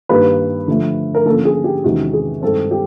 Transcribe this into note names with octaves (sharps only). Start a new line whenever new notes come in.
G2 D#3 G3 A#3 B4
D3 F3 A3
A#4
D3 F3 A#3 C#4 A4
G#4
G4
E2 C3 D#3 G#3 C#4 F#4
G#4
G2 D#3 G#3 C4 A4
G4